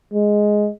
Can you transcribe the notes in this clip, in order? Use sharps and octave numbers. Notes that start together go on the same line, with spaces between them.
G#3